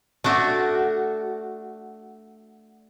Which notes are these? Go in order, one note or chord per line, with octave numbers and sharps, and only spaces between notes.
A3 D4 F#4